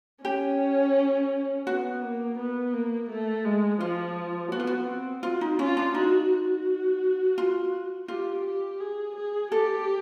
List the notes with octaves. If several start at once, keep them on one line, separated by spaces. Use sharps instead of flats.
C#4 G4
B3 F#4
A#3
B3
A#3
A3
G#3
F3 F4
B3 F#4
F4
F#4
C4
F4 F#4
D#4
C#4 F4
D4
D#4 F#4
F#4
F4
F4 G4
G4
G#4
G#4
G4 A4